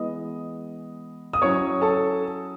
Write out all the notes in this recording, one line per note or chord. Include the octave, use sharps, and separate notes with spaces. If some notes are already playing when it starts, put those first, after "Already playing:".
Already playing: E3 G#3 B3 E4 D#5 D#6
D#6
F#3 C#4 E4 C#5 C#6
A4 A5